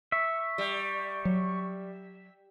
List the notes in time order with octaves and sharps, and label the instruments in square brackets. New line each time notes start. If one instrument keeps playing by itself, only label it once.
[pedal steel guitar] E5 [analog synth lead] C#6
[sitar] G3
[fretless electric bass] F#3